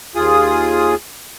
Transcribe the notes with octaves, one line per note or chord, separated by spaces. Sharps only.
D#2 F4 G#4 D#6